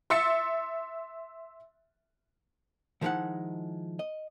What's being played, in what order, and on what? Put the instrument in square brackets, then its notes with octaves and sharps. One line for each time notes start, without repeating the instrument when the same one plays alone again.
[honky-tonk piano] E5 C6 E6 A6 C#7
[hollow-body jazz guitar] D#3 F3 G#3 D#4 E4 F#5
D#5